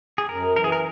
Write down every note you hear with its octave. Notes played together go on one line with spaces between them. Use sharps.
G#4
F#2 A#4
E3 A#4
G#4
A#4